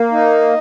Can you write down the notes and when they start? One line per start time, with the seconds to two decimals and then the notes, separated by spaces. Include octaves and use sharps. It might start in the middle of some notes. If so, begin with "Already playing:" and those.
Already playing: A#3
0.12 D#4